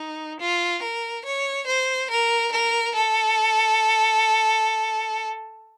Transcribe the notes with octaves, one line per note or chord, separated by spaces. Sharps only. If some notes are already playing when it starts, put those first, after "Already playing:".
Already playing: D#4
F4
A#4
C#5
C5
A#4
A#4
A4